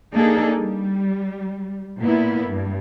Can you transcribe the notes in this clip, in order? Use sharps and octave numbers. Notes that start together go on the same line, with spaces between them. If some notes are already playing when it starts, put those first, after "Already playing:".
A#3 D4 D#4 G#4 A4
G3
A#2 A#3 B3 E4
G2